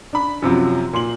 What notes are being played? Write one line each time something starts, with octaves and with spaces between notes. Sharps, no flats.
D4 B5
F#2 C3 F3 F#3
A#2 C6 F#7